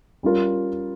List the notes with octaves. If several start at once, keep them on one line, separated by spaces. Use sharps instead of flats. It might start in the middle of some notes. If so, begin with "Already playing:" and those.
G3 C#4 F4 A#4